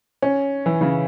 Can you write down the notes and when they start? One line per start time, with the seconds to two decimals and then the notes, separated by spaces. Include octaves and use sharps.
0.22 C#4
0.66 E3
0.81 C#3